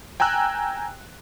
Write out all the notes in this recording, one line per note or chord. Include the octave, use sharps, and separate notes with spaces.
G5 G#5 A#5 E6 F#6